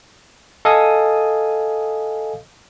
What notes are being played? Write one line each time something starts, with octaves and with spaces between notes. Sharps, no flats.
A4 D#5 F5 G#5 D#6